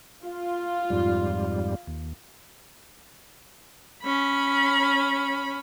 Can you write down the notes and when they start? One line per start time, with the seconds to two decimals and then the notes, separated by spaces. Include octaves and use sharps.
0.24 F4
0.90 F2 G#2 G3
1.87 D#2
4.02 C#4 B5